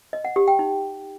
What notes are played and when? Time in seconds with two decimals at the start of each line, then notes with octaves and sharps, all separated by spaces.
0.13 D#5
0.25 F#5
0.36 G4
0.48 G5
0.59 D#4